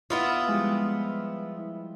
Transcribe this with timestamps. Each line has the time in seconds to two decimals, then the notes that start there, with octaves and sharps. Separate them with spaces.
0.10 B3 E4 F4 D#6
0.48 F3 G3 G#3